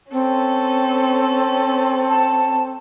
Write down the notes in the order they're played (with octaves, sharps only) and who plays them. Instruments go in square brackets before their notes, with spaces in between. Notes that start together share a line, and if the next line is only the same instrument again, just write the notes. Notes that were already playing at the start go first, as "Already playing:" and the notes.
[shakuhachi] C4 [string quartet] C#4 A4
[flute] A5